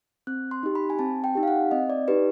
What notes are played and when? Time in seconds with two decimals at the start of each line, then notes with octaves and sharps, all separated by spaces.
0.27 C4 F#6
0.51 C6
0.63 D#4 G4
0.75 B5
0.90 G#5
0.99 C4 A5
1.24 G5
1.35 D#4 G4
1.43 F5
1.48 F#5
1.71 C4 D#5
1.89 D5
2.08 D#4 G4 B4